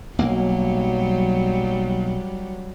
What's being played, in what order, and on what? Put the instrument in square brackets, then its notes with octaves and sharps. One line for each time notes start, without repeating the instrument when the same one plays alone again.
[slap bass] B1 A#3 [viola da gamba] F#3 G3